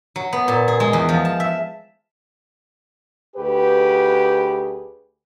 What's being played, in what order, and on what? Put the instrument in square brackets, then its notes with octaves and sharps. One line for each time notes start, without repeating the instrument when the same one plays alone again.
[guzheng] F#3
B3
A#2
G#4
G#3
E2
F3
A5
E5
[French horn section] D2 G4 G#4 B4